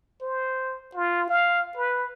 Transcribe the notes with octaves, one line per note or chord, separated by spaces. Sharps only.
C5
F4
F5
B4